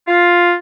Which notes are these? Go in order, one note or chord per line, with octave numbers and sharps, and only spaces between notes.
F4